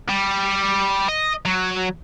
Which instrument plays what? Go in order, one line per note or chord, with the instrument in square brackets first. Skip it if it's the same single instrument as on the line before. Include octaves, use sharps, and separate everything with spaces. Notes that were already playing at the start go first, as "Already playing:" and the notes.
[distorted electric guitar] G3
D#5
F#3